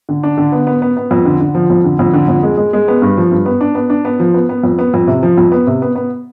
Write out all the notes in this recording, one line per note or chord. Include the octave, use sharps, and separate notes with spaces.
D3
D4
D3
B3
B3
B3
B3
F2
D3
D3
F3
F2
D3
F2
D3
F2
G#3
G#3
G#3
B3
G2
F3
G2
B3
D4
B3
D4
B3
F3
B3
B3
F2
B3
F2
C3
F3
F2
B3
C3
B3
B3